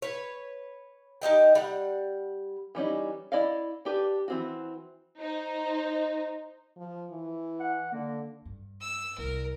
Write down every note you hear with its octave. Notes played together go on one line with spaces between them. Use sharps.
B4 C#5
D#4 G4 D#5 G5
G3 F#5
E3 G3 C#4 D#4
E4 D5 D#5 F5
D4 G4 B4
E3 C4 F#4
D#4 C5
F3
E3
F#5
D3 A#3
G2
E6
C2 A#4